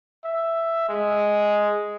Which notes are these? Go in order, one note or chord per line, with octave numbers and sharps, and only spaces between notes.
E5
G#3